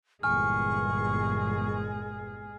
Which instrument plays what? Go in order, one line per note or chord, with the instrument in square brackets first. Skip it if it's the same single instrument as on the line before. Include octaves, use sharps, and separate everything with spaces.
[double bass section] G1 E2 A#2 [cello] G#3 G#4 [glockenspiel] G#5 F6 [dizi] C#6